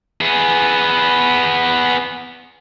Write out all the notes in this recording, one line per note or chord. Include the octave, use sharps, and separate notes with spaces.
B3 G#4